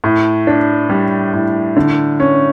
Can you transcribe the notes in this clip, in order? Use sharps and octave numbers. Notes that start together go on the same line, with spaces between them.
A2
D4
G3
A2
D3
C#4